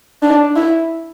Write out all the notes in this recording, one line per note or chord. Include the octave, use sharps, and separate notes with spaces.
D4
E4